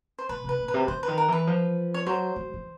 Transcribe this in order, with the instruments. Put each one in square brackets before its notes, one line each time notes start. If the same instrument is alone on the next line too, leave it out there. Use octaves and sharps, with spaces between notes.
[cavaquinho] C5
[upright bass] B2 [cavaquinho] B4
[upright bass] C3 [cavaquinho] B4
[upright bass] A#2
[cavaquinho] B4
[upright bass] C3
[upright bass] D3 [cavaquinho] C5
[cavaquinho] B4
[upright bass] D#3
[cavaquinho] A#4
[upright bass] E3 [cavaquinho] B4
[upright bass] F3
[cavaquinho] C#5
[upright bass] F#3 [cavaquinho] C5
[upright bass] F#3
E3